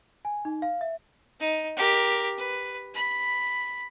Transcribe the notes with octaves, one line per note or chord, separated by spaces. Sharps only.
G#5
D#4
F5
E5
D#4
G4 A#4
B4
B5